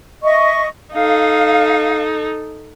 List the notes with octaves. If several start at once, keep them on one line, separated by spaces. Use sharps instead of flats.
D#5 E5 C#6
D#4 A4 F5